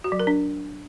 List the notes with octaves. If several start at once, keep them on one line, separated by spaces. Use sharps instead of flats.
F#4
F#3
A#4
D4